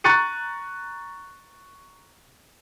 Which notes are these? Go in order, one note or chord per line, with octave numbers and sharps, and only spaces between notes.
A#5 C#6 F#6 A6 C#7 D#7